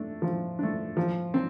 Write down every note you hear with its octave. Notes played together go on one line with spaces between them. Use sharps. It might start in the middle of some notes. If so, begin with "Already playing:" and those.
Already playing: A3 D4
F3
A3 D4
F3
C4